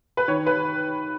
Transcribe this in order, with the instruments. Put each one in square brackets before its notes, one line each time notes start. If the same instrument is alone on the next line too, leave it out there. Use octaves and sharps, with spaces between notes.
[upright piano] B4
D#3 C#5
B4